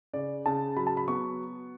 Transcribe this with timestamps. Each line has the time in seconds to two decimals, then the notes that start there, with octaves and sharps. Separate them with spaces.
0.13 C#3 D5
0.46 C#3 A5
0.77 F#3 B5
0.87 A5
0.97 B5
1.08 B3 C#6